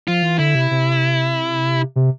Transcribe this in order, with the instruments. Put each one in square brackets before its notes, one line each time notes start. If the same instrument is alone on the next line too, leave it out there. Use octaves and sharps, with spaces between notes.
[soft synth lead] F3 [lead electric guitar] F4
[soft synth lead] E3
[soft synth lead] D3 [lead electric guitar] E4
[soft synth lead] C3
C3
C3